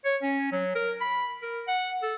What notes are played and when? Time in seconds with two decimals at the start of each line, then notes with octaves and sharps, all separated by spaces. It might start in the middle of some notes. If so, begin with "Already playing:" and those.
0.05 C#5
0.22 C#4
0.52 F#3
0.75 A#4
1.01 B5
1.42 A#4
1.68 F#5
2.03 A4